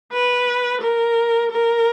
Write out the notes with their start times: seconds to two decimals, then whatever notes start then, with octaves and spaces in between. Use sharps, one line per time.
0.13 B4
0.82 A#4
1.51 A#4